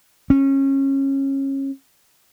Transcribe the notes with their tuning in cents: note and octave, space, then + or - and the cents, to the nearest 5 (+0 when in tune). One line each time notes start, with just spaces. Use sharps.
C#4 -25